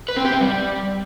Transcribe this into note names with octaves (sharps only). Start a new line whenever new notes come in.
B4
C4
G4
C4
G3